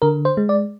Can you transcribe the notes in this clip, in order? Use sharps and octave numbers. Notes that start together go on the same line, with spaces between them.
D3 A#4
C5
G#3
D5